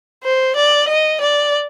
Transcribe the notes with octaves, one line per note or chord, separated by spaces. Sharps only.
C5
D5
D#5
D5